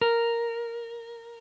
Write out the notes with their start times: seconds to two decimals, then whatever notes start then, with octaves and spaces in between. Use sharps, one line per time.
0.01 A#4